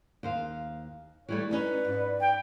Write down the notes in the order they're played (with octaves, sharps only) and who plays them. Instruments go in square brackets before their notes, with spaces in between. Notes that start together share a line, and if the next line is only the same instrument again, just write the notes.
[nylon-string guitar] D#2 C5 F5
[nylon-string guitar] E3 G3 A3 [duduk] C#5
[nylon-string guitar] C#4 D#4 [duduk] B4 [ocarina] D5
[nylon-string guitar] G#2
[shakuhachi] G5